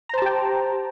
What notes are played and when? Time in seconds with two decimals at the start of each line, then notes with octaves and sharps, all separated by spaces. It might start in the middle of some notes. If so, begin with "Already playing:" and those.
0.09 A#5
0.14 C5
0.18 A5
0.22 G4
0.26 G5